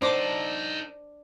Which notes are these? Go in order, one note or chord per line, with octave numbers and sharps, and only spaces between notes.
D4 D#4 A4 C5 C6 D6